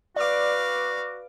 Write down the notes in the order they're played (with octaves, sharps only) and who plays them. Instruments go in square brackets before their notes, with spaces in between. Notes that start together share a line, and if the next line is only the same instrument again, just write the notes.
[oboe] F#4 [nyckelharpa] B4 F5 [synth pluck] D5 D6